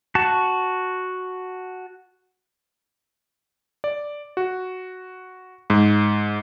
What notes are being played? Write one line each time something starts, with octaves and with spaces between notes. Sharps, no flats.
F#4 A5
D5
F#4
G#2